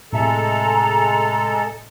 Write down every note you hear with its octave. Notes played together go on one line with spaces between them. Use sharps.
A2 C3 G#3 A4 E5 A#5